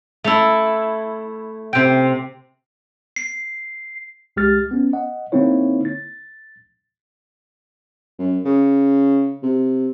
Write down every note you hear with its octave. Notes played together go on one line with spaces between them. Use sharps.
A3 E4
C3 G5
C7
C2 G#3 G4 F6 A6
B3 C#4
D#5 F#5
D3 A#3 C4 D#4 E4 C#5
A6
F#2
C#3
C3